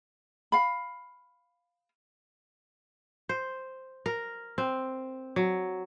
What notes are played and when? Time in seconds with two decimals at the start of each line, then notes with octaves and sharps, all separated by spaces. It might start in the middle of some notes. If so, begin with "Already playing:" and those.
0.52 F5 B5
3.29 C5
4.06 A#4
4.58 C4
5.36 F#3